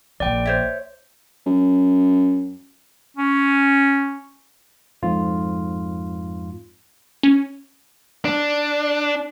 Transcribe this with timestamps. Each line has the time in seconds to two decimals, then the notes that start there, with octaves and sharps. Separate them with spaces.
0.20 A#1 F4 D5 G5
0.46 C5 C#5 E5
1.46 F#2
3.17 C#4
5.03 F2 G#2 F4
7.23 C#4
8.25 D4